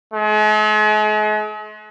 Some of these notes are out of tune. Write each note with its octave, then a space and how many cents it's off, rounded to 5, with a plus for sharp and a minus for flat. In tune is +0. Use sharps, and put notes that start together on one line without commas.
G#3 +45